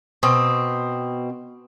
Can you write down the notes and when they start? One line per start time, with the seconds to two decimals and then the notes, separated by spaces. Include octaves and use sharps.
0.23 B2 C4